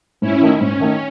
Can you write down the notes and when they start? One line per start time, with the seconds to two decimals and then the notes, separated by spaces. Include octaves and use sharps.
0.21 G#2 C#4 E4
0.41 D#3 A3 D#4
0.61 G#2 C#4
0.80 D#3 A3 D#4